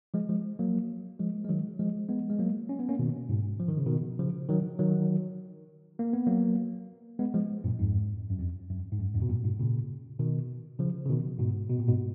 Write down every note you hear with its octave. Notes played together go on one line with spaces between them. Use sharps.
F3 G#3
F3 G#3
F#3 A#3
F3 G#3
G#3
D#3 F#3
F3 G#3
G#3 B3
G#3
F#3 A#3
C#4
B3
A#3 C#4
B2 D#3
G#2 B2
F3
D#3
C#3
B2 D#3
C#3 F3
D#3 F#3
D#3 F#3
A#3
B3
F#3 A#3
G#3 B3
F3 G#3
F#2 A#2
F2 G#2
F#2
F2
F#2
G#2
F#2
F2 G#2
B2
F#2 A#2
G#2 B2
A#2 C#3
B2 D#3
C#3 F3
C#3
B2 D#3
G#2 B2
B2
A#2
G#2 B2